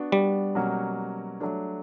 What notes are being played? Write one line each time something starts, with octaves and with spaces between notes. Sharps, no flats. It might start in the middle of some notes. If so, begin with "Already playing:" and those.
Already playing: B3 D4 F#4
G3
B2 F#3 A#3 C#4 F#4
F#3 A3 D4